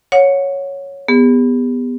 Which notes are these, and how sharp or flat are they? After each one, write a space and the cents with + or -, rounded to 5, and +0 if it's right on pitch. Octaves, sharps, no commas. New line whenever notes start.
C#5 +0 F#5 -30
B3 +0 G4 +45